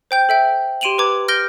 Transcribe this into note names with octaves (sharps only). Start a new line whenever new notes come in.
C5 G5 G6
A4 E5 G5
G4 C6 D7 D#7 F7 F#7
B4 A#5 D6 G#6
F6 G6 A#6 D7 G7